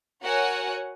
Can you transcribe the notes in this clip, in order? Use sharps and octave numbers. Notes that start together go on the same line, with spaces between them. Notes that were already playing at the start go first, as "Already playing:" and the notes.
F#4 A#4 C#5 F#5 G#5